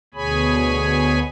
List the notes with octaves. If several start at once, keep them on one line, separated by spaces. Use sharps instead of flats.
D2 B2 G#4 C#5 G#5 B5